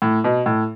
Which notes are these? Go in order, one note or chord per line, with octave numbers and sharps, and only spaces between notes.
A2
B2
A2